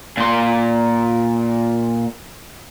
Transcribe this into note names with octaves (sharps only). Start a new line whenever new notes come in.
A#2 C6